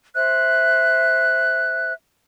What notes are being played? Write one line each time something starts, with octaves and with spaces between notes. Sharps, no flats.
C5 E5 F#6